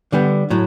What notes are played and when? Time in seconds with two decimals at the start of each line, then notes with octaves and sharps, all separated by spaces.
0.12 D3 G3 B3
0.50 A2 F#3